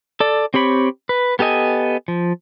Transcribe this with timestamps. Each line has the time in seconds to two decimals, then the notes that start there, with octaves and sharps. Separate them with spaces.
0.20 A4 D5
0.54 C4 G4 C#5 B5
1.09 B4
1.39 B3 G4 A4 D#5 G#5
2.08 F3